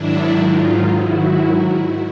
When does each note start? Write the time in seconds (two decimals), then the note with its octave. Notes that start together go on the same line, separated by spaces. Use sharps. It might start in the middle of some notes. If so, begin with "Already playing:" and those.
Already playing: G#2 D#3 F#3 D4 E4
0.40 D#4 F4
0.92 E4 F#4